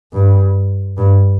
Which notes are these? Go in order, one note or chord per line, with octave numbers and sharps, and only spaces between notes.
G2
G2